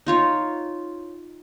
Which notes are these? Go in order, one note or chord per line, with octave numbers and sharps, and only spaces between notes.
D#4 F4 C#5